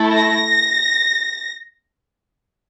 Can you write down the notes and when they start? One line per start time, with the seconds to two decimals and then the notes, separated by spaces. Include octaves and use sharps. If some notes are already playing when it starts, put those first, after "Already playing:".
Already playing: A3 E4 A4
0.14 A#6